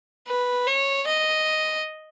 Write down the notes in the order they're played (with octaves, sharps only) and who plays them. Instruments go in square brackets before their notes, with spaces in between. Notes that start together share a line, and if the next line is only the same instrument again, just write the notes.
[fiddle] B4
C#5
D#5